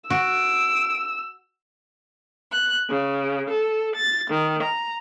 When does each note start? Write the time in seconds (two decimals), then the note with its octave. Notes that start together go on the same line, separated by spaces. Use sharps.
0.10 F#4 E6 D7
2.52 F#6
2.88 C#3
3.49 A4
3.95 A6
4.29 D#3
4.62 A#5